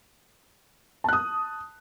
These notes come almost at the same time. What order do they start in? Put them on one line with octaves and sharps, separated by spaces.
A5 F#6 D#6